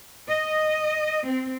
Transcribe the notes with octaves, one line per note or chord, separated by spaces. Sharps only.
D#5
C4